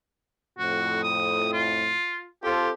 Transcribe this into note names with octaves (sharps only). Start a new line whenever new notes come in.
F2 A2 F#4
D#6
F4
C4 F4 G4 A4